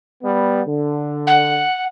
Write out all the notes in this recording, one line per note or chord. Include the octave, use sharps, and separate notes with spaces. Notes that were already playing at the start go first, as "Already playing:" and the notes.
G3 B3
D3
F#5